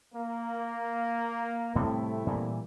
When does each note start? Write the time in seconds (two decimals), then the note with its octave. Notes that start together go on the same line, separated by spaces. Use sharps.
0.14 A#3
1.75 A2 C3 G3 A3 C4 E4
2.27 A#2 E3 G3